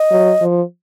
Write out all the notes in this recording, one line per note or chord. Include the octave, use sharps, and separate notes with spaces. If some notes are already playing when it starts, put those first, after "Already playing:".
Already playing: D#5
F#3
F3